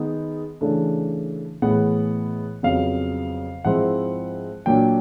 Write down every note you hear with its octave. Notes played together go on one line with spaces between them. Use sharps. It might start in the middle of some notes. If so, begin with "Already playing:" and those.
Already playing: D#3 G#3 B3 D#4
C#3 E3 A3 D4
A2 E3 G#3 B3 F#5
F2 C#3 F#3 B3 F5
G#2 F3 G#3 C4 E4 F#5
A#2 F#3 A#3 D4 G5